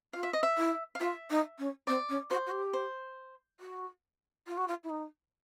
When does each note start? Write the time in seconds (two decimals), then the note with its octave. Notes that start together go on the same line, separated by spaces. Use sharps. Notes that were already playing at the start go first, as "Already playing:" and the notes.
0.13 F4 F5
0.23 E5
0.33 D#5
0.43 E5
0.57 E4
0.95 F5
1.00 F4 E5
1.30 D#4
1.58 C#4
1.87 C4 D5
2.09 C#4
2.30 F#4 C5
2.46 F#4
2.51 G4
2.73 C5
3.60 F#4
4.47 F4
4.57 F#4
4.68 F4
4.83 E4
4.89 D#4